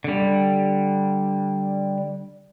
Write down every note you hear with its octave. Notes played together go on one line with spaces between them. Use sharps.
D3 G3